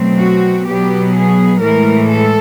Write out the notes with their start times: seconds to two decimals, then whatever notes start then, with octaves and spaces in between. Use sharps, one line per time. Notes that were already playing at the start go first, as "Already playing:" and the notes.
Already playing: B2 F#3 A3 C4
0.19 F#4
0.67 B2 F#3 B3 G4
1.15 G#4
1.62 A2 E3 G#3 A#4
2.09 A4